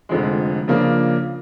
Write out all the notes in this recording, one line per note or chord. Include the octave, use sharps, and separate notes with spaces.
F1 F2 D3 F3 G#3
C#3 F3 A#3 D4